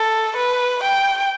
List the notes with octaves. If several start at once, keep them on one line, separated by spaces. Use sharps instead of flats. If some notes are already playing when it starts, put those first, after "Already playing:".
Already playing: A4
B4
G5